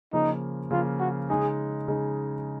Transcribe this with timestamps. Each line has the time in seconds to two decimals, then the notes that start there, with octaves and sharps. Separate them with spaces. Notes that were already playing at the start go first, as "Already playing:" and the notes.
0.13 C#3 F3 A#3 D#4
0.71 C#3 F3 A#3 F4
1.00 F#4
1.29 C#3 G#3 D#4 G#4
1.88 C#3 G#3 D#4